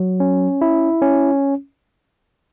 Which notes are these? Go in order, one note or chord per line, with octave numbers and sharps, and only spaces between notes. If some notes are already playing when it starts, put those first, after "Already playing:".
Already playing: F#3
C#4
E4
C#4